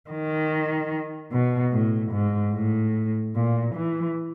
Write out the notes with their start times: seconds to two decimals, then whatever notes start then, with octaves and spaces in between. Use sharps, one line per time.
0.10 D#3
1.32 B2
1.73 A2
2.12 G#2
2.53 A2
3.35 A#2
3.75 E3